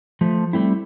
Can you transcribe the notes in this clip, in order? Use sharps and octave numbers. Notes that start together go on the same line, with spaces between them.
F3 A3
G3 A3 C4 E4